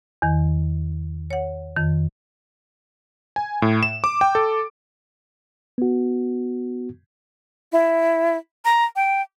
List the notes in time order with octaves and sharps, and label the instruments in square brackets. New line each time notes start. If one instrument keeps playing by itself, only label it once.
[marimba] E2 D#3
C#5 F#5
F2 D#3
[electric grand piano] G#5
A2
E7
D6
G5
A4
[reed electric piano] B3 F#4
[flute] E4
A#5
G5